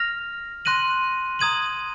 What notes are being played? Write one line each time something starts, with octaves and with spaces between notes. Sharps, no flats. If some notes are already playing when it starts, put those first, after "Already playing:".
Already playing: F6 A#6 F7
C6 F#6 A#6 D#7 F#7
A#5 D#6 G#6 D#7 F#7